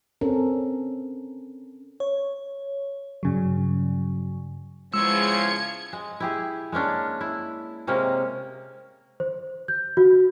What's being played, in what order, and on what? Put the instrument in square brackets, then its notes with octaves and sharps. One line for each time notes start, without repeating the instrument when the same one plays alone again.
[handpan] C4 C#4 A4 A#4
[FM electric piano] C#5
G2 C#3 F#3
[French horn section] E2 C#3 F3 [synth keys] G#3 [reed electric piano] E6 [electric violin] G#6 C#7
[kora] G#3
E4 G4 G#4
G#3 A#3 C#4 D4
E4
C3 G#3 A#3 C#4
[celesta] C5
G6
F#4